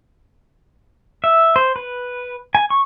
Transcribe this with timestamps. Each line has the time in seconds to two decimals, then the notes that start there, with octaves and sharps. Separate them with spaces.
1.24 E5
1.56 C5
1.76 B4
2.55 G#5
2.70 C#6